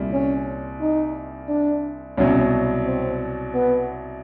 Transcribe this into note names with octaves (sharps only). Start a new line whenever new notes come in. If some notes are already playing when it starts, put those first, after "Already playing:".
Already playing: C2 A#2 G3
C#4
D#4
D4
C2 B2 F#3 C#4
C4
B3